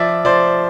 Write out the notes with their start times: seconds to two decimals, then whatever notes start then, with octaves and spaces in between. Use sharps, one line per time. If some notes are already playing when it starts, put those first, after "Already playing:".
Already playing: F3 D5 E5
0.25 F3 C5 D5